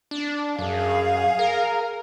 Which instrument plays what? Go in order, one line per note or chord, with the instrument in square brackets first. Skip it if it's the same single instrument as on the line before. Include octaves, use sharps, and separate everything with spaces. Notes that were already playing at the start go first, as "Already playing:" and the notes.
[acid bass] D4
[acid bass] F#2 [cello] G#4 F5
[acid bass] A#4